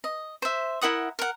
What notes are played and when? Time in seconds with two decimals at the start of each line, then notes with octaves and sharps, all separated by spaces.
0.04 D#5
0.42 C5 E5
0.81 E4 A#4 F#5 D#6
1.19 A#4 F#5